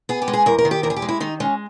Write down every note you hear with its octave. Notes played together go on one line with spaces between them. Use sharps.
B3 G#4
G4
G#3
G#4
E2 A#4
A#4
D#3
G4
E2 A#4
G#4
G4
G#3
E4
D#3 D#4
G#3 C#4